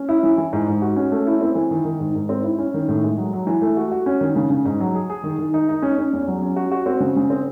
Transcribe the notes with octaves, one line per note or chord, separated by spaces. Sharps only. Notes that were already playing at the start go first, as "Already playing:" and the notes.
Already playing: C#4
E4
E3
E3
G#2
G#2
F#4
C#4
A3
E4
C4
E3
D#3
D#3
G#2
G#2
C4
E4
C#4
D#3
A2
G#3
F#3
F#3
E3
A3
F#4
F#4
C#4
D#3
C#3
C#3
G#2
F#3
G#4
G#4
D#3
D#3
D#4
D#4
C#4
C#4
E2
F#3
C#4
F#4
F#4
C4
C#3
C#3
C4